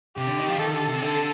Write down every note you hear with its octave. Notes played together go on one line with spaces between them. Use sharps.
C3 G4
D3
D#3
F3
D#3 A4
D3
C3
D3 A4